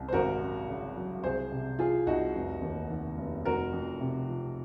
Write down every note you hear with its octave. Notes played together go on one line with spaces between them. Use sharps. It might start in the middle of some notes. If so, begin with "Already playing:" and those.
Already playing: C2
C5
G#1 F#4 A#4
F#2
C#3
F#3
C2 G#4 C5
C3
F3 F4 G#4
C2 D#4 F#4
F1
D#2
D#3
F1
F1 F#4 A#4
F2
C3
F3